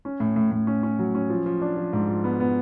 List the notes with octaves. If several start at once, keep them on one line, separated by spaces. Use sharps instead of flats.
C#4
A2
A2
A2
C#4
C#4
F#3
C#4
F3
F3
D4
F3
G#2
F3
B3
B3